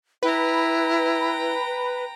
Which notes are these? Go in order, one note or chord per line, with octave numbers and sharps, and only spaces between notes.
E4 B4 G5 A#5